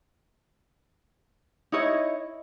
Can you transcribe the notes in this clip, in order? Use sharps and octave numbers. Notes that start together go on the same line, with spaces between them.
D#4 E4 C#5 D#5